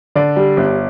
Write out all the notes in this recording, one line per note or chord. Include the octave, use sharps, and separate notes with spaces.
D3 D5
G3
G1